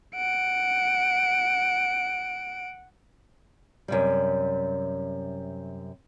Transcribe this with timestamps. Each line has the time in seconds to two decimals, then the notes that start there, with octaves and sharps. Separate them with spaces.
0.16 F#5 D7
3.88 F#2 C3 G3